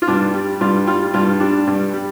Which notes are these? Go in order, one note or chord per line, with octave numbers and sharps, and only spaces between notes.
F4
G2 D4
G3
G2 F4
G3 F4
G2 F4
G3 D4
G2
G3